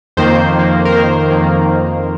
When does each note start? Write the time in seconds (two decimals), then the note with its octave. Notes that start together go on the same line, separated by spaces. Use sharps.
0.17 F2 D#3 A#3 C5
0.55 F2 D#3 A#3
0.85 A#4
0.92 F2 D#3 A#3 C5
1.30 F2 D#3 A#3